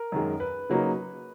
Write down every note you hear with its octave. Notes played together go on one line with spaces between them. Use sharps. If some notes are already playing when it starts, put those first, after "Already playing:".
Already playing: A#4
F#2 D#3 G#3
B4
C#3 F#3 A#3 D#4